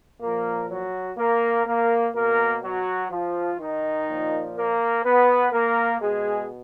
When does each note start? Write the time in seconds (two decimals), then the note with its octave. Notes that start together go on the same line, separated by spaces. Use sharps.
0.20 A#2 F3 A#3 A#4
0.69 F#3 F#4
1.17 A#3 A#4
1.66 A#3 A#4
2.14 B2 A#3 A#4
2.62 F#3 F#4
3.10 F3 F4
3.59 D#3 D#4
4.08 A#2 F3
4.56 A#3 A#4
5.04 B3 B4
5.52 A#3 A#4
6.00 B2 G#3 G#4